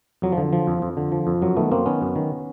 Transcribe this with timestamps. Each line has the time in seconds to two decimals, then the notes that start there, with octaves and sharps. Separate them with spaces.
0.22 F2 F#3
0.32 F3
0.37 D3
0.53 F3
0.67 F2
0.82 F2
0.97 D3
1.12 F3
1.27 F2
1.42 F#2 F#3
1.56 D#3 A3 B3
1.71 F#2 A#3 C4
1.86 D#3 B3 C#4
2.01 F#2
2.16 D#3